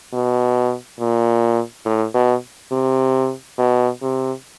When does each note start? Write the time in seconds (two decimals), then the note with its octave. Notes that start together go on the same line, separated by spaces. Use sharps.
0.13 B2
1.00 A#2
1.85 A2
2.14 B2
2.72 C3
3.58 B2
4.02 C3